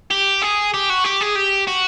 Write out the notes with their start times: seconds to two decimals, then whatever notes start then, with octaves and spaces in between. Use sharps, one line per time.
0.11 G4
0.42 G#4
0.74 G4
0.90 F#4
1.04 G4
1.21 G#4
1.36 G4
1.68 F#4